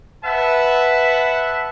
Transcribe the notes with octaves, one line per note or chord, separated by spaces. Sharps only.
B4 E5 F#5 A5